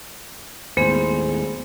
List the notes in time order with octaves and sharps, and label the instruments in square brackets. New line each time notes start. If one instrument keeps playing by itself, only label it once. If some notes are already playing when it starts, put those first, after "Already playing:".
[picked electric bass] D#2 A2 [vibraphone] G#3 B3 G#4 [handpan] C5